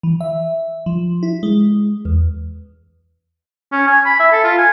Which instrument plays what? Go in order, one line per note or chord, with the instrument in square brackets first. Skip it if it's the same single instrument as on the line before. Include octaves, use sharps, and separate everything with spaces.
[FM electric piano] E3
E5
F3
E4
G#3
E2
[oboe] C#4
G#5
B5
E5
A4
F4
G#5